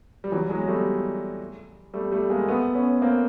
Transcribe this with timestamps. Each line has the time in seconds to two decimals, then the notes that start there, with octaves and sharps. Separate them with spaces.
0.24 G3
0.32 E3 F#3
0.49 F#3 G#3
0.68 G3 A3
1.94 G3 A3
2.12 G3 A3
2.30 G#3 A#3
2.48 A3 B3
2.75 B3 C#4
3.02 A#3 C4